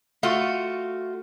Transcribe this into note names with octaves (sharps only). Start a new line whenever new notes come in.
A3 F4 F#4